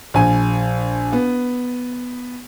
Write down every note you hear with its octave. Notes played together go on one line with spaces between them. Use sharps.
A#1 G#5
B3